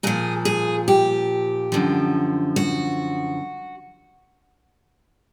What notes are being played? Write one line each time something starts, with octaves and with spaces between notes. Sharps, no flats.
A#2 F3 G#4
G#4
G4
F#2 D3 F3
F#4